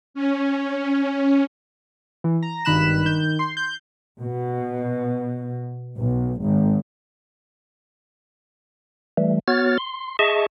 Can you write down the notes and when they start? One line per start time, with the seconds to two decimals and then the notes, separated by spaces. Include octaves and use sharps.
0.14 C#4
2.24 E3
2.43 A#5
2.65 G#1 G2 D#3 B5 F#6 E7
3.05 D#3 G6
3.39 C6
3.57 G6
4.21 B2
5.98 B1
6.41 G#1
9.17 E3 G3 A3
9.48 B3 F#4 C#5 F6 A6
9.78 C6
10.19 G#4 D#5 E5 A5 C#6